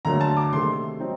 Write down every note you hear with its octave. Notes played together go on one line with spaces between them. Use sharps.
D2 D3 F#3 A#3 A#5
A5
D6
C3 D#3 A3 C6
F#3 C4 D#4